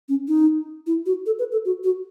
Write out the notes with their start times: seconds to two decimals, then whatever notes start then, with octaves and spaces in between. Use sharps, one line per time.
0.09 C#4
0.28 D#4
0.87 E4
1.06 F#4
1.26 A4
1.39 B4
1.52 A4
1.65 F#4
1.84 F#4